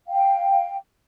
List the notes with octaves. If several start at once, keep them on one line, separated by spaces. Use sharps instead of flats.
F5 G5